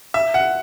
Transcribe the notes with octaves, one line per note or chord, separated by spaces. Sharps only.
E5
F#5